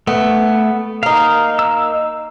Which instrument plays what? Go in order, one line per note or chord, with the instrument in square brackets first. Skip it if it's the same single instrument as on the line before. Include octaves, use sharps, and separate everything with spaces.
[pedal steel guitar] A3 [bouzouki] B3
[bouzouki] A#3 D#4 [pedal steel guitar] F5
[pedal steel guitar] E6